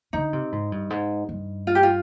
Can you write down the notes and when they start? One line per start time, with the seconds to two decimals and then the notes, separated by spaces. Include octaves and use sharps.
0.13 D3 D#4
0.33 C3
0.52 G#2
0.72 G2
0.90 G#2
1.29 G2
1.67 F4
1.75 G4
1.83 F4